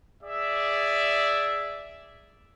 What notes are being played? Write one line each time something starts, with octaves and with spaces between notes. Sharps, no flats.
G#4 D5 E5